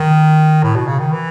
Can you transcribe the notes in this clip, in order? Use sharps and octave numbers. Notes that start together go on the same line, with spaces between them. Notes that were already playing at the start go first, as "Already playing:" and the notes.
Already playing: D#3
A2
B2
C#3
D#3
E3